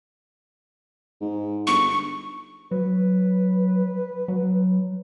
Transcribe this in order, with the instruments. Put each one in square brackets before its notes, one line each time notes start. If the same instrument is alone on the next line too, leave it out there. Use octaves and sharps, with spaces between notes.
[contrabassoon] G#2
[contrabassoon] G1 [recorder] C#6
[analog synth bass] F#3 [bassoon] B4
[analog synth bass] F#3